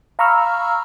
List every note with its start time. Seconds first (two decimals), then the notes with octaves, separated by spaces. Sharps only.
0.19 F5 A#5 B5 C#6 E6 F6